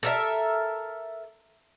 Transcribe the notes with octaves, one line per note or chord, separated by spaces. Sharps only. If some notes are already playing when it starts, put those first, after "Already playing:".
A4 A#4 E5